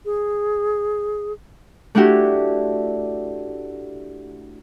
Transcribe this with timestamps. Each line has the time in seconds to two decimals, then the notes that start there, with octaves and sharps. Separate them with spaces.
0.05 G#4
1.95 A3 D4 E4 F#4 G4